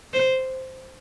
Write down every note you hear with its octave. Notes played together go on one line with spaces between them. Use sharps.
C5